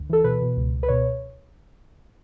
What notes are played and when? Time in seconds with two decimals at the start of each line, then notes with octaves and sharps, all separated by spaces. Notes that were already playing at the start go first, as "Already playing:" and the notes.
Already playing: D2
0.10 E3 A4
0.24 B2 B4
0.41 B2
0.57 C#2
0.73 C#2
0.83 B4
0.88 B2 C#5